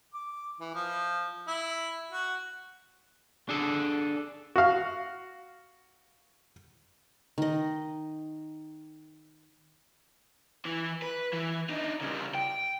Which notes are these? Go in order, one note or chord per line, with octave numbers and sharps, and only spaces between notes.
D6
E3
F3
E4
F#4
D4 G#4 A4
F#4 F5
D#3 D#5
E3
B4
E3
D4 D#4
C#3 G3
G5